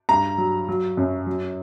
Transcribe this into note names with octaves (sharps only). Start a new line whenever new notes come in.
G2 A#5
F#3
F#3
F#2
F#3